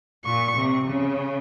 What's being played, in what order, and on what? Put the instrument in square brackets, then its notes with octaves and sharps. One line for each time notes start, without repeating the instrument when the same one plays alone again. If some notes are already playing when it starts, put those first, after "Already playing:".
[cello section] A#2 [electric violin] C#6
[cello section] C3
C#3